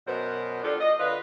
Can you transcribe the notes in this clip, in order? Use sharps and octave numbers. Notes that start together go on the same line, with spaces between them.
F#2 B2 B3 A#4 C5
G3 D4 F4 A4
D#5
D3 F4 B4